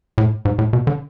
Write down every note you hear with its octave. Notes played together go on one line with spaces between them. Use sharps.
A2
G#2
A2
B2
D3